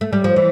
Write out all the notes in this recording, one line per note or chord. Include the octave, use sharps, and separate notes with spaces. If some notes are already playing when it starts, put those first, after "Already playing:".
A3
G3
F3
E3